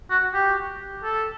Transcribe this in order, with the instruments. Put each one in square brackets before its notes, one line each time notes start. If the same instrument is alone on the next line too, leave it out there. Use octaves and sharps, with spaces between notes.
[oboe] F#4
G4
A4